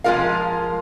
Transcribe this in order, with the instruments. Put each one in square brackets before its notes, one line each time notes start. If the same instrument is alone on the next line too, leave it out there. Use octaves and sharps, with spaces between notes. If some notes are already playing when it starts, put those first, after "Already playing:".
[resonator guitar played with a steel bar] F3 G#3 A3 F4 A#4 F5